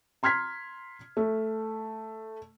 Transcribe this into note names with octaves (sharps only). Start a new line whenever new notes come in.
A#5 C6 F6 G#6 B6
A3